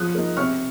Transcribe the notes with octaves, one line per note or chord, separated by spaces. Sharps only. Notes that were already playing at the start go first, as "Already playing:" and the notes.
Already playing: F3 D#6 F#6
A#3 D#4
C3 C#6 F6